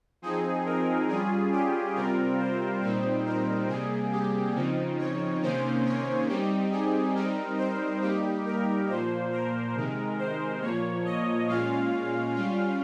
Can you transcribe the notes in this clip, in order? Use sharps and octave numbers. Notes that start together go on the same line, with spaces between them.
F3 C4 D#4 G#4
A#4
G3 C#4 F4 G#4
G4
C3 G3 C4 F4 A#4
C5
A#2 G3 C4 D#4 C5
A#4
C3 G3 A#3 G#4
G4
C#3 F3 C4 D#4
C#5
C3 D#3 A#3 C#4 C5
C#5
G3 C4 D#4 G4
G#4
G3 C4 D#4 A#4
C5
G3 A#3 D#4 G4
A#4
A#2 F3 A#3 C5
A#4
C3 D#3 G#3
C5
A#2 F3 A#3 C#5
D#5
A#2 G#3 C#4 F4 F5
G3 C#4 F4